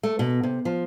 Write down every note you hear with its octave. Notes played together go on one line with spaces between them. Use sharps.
A3
B2
C3
F3